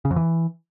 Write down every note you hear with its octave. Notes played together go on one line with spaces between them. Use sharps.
C#3
F2
E3